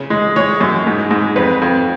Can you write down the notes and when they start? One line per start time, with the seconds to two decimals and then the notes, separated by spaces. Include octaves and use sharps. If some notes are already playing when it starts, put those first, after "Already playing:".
Already playing: C#3
0.10 G#3
0.36 G#3 C#5
0.60 F#2
0.87 G#2
1.11 G#2
1.36 F2 B4
1.62 F2